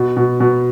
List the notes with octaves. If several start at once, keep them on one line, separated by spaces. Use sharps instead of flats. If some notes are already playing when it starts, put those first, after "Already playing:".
Already playing: B2
B2
B2